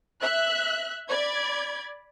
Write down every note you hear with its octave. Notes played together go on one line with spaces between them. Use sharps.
E5 F#6
D5 B5 G#6